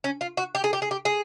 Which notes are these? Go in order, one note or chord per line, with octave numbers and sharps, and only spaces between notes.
C#4
F4
F#4
G4
G#4
G4
G#4
G4
G#4